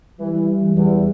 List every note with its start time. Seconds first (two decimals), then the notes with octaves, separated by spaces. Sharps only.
0.20 E3 G3
0.48 E3
0.76 E2 G3